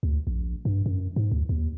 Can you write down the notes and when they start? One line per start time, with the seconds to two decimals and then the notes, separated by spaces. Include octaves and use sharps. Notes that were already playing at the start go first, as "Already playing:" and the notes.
0.03 D2
0.27 A#1
0.65 G2
0.86 F#2
1.16 G#2
1.32 D2
1.49 D#2